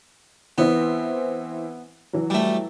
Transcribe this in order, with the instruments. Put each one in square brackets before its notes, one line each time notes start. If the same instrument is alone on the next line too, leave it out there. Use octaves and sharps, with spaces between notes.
[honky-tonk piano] E3 C4 E4 [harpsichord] B3
[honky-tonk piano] E3 F#3
[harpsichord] G3 A3